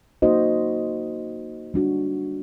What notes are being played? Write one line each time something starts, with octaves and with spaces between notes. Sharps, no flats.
A#3 D#4 F#4 C5 D#5
G3 D4 F#4